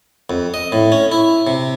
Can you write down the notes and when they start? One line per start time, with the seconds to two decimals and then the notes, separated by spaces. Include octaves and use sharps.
0.30 F2
0.54 D#5
0.72 A2
0.92 C#4
1.12 E4
1.47 C3